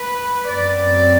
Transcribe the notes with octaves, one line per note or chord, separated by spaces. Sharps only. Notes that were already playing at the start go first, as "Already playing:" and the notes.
Already playing: B4
F#2 F#3 C4 D5